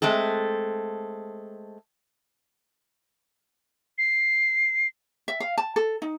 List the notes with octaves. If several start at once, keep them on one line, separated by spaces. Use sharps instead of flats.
G#3 A3 C4 A4
C7
E5
F5
A5
A4
D#4